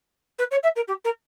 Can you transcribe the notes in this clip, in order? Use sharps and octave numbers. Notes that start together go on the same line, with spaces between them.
B4
C#5
E5
A#4
G4
A#4